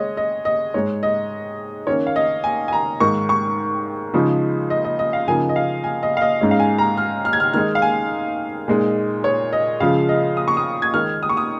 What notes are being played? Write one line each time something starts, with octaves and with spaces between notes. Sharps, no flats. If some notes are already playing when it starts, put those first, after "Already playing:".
Already playing: G#3 C#5 D#5
D#5
D#5
G#2 G#3 D#4 C#5
D#5
D#3 A#3 C#4 C#5
F5
D#5
G#5
G#5
A#5
G#2 D#3 A#3 C#6
C#6
C#3 F3 G#3 D#4
D#5
D#5
D#5
F5
C#3 F3 A#3 D#4 G#5
D#5
F5
G#5
D#5
F5
D#5
G#2 G#3 C#4 D#5
F5
G#5
A#5
F6
F6
G#6
F6
D#3 G#3 D#4 F6
F5
G#5
A#2 G#3 D#4
C#5
D#5
C#3 F3 G#3 F5
D#5
D#6
C#6
D#6
G#6
D#3 G#3 D#4 F6
D#6
C#6
D#6